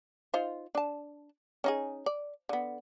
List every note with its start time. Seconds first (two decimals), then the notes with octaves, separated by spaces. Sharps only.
0.34 D#4 F4 C5
0.75 D4 A5
1.64 C#4 D#4 G#4
2.06 D5
2.49 D3 B3